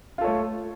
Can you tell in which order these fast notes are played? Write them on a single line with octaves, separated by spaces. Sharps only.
F4 A4 C#5 A3